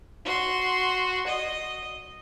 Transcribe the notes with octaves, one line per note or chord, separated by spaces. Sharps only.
F#4 C6
D#5